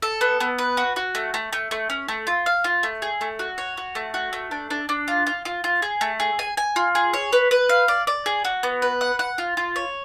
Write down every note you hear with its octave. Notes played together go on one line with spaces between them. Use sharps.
A4
B3
B3
B4
F#4
F#4
A3
A3
A3
A3
C#4
A3
F4
F5
F4
A3
G#4
A3
F#4
C#5
F#4
A3
F#4
A3
D4
D4
D4
F4
F4
F4
F4
G#4
A3
G#4
G#5
G#5
F4
G#4
C#5
B4
B4
F5
D5
D5
G#4
F#4
B3
B4
F#5
F#5
F4
F4
C#5